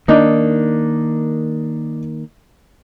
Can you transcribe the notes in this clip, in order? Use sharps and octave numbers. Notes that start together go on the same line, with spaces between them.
D#3 A#3 D4 D#4